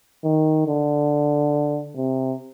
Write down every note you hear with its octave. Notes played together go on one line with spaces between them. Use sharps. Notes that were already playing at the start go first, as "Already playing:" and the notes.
D#3
D3
C3